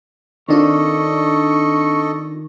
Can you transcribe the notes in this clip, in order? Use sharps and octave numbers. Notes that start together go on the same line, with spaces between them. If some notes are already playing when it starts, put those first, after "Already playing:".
D#3 C4 D4 F4 A4 D#5 C#6